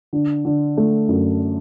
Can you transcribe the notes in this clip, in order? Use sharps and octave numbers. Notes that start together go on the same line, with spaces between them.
D3
D3
A3
F#2